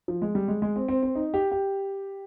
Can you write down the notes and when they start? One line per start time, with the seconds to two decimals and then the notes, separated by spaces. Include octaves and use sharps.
0.08 F3
0.22 G#3
0.35 G3
0.48 G#3
0.62 G#3
0.76 C4
0.88 C4
1.03 C4
1.15 D#4
1.34 G4
1.51 G4